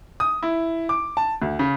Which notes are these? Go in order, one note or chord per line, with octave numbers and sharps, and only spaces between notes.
D#6
E4
D6
A5
D2
C#3